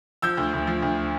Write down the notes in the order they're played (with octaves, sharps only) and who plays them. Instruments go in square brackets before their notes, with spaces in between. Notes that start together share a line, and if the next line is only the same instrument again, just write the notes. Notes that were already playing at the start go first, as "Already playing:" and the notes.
[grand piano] F3 E6 G6
D2
D2
F3
D2